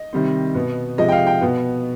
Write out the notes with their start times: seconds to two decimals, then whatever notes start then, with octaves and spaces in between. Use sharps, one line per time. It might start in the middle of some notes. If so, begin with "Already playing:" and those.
Already playing: D#5
0.13 C3 D#3 G3 C4
0.55 B2 B3
0.98 C3 F3 G#3 D#5
1.09 G5
1.12 F5
1.27 G5
1.41 B2 B3